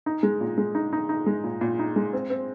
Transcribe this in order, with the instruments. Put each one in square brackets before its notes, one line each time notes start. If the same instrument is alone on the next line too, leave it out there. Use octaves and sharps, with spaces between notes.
[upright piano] D#4
G#3
A#2
G#3
D#4
D#4
D#4
G#3
A#2
A#2
D#4
G#3
C4
C4